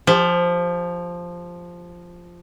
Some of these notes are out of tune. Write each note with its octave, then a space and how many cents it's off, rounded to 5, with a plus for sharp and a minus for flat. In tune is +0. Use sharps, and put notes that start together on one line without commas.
F3 +0 G4 +35